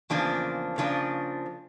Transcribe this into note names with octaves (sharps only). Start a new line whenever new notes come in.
E2 C#3 F3 A#3 D4
C#3 F3 A#3 D4